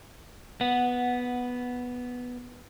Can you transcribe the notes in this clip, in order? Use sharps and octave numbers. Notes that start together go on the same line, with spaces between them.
B3 F#5